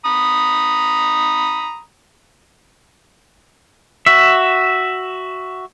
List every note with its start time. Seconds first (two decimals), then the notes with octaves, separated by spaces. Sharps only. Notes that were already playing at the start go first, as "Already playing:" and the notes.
0.06 A#5 B5 D#6
4.06 F#4 E5